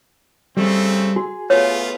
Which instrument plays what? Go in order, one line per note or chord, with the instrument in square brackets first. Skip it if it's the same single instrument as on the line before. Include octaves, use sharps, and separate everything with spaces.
[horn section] C#3 A3 C4 [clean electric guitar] G3
[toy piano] F#4 [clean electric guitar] G#4
[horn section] A3 B3 F4 [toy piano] C#5